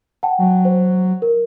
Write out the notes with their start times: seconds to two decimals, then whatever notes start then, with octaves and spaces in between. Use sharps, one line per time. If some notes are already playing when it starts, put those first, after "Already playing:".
0.23 F#5 G5 A5
0.38 F#3
0.65 C5
1.22 A#4